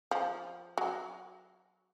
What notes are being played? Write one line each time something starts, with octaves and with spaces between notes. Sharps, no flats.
F3
F#3